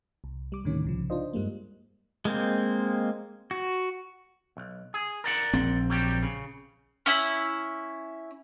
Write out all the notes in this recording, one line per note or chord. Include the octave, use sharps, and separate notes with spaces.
C2
G3 D6
D2 A2 C3 D#3 C#4
C2 C#3 F3
D4 D#4 F4 C5 D#5
G2 G3 G#3 A#3
G#3 A#3 C4
F#4
B1
G#4
A#4 D5 F#5
A#1 C4
F#3 G3 G4
C#3
C#4 E4